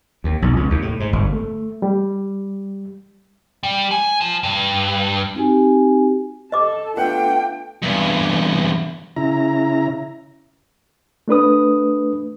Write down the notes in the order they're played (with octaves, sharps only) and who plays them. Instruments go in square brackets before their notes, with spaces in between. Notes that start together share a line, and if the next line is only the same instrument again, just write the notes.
[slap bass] D#2
B1
C#2
D#2
A2
G#2
G1
[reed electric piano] A3
G3
[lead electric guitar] G3
G#5
F3
G2
[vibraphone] C4 D#4 F#4 G4 G#5
[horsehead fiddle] A4 A5 [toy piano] D#5 D6
[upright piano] A3 B3 F#5 [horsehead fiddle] D4 F4 [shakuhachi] G5
[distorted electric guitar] E2 G2
[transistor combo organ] C#3 E4 A#5
[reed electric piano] A3 D4 B4 D#6